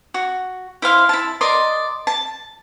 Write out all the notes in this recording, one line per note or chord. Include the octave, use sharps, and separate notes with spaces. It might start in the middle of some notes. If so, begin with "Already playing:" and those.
F#4
E4 C5 F5 C6
E4 A5
A#4 D5 D#5 C6
A5